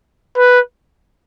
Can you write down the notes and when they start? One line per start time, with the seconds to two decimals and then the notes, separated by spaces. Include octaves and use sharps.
0.37 B4